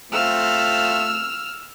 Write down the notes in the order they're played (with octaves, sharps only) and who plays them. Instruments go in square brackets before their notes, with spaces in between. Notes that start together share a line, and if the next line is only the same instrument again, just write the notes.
[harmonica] A3 C4 F4 [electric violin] E6 F6